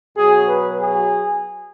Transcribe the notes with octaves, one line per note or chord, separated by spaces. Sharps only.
B2 F#3 G#4
B4
G#4